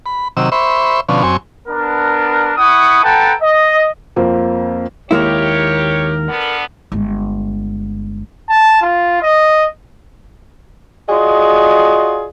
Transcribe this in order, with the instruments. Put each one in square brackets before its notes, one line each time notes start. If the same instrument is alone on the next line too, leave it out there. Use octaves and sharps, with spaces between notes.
[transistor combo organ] B5
C3 D#3 F#3 E6
C5 E5 B5 C#6
B2 D3 F3 C#4
F#2 C4 G#5 C#6
[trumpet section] B3 D4 A#4
E4 F#5 C#6 D#6
A4 B4 F#5 G5 A5 A#5
D#5
[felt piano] F2 A#3 C4
[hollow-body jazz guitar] D#2 G#3 E4 [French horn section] G4 C#5 [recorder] A#4
[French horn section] D3 B3
[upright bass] G1 G#3
[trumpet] A5
F4
D#5
[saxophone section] F4 F#4 G#4 D5 D#5